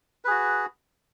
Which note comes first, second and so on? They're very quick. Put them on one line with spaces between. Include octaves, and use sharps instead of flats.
B4 G#4 F#4